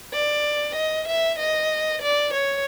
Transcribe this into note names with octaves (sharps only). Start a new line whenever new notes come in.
D5
D#5
E5
D#5
D5
C#5